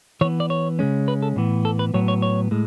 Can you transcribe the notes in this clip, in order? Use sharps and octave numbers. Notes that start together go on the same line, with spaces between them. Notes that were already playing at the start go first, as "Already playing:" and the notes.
E3 B3 C#5
D5
C#5
C#3 G#3 C#4
B4
A4
A2 E3 B3
A4
B4
A2 F#3 B3 C#5
C#5
C#5
A2 G#3